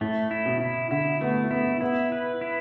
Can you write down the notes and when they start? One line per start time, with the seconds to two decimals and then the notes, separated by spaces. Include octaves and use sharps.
0.01 A2 A3
0.31 E4
0.45 B2
0.61 E4
0.91 D3 E4
1.21 A3 B3
1.51 B3 E4
1.81 B3 E4
2.12 B4
2.41 E4